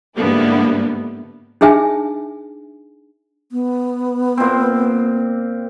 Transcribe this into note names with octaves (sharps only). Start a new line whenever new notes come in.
G#2 D3 G3 A#3 B3 E4
D4 D#4 G#4 E5 G#5
B3
A#2 C4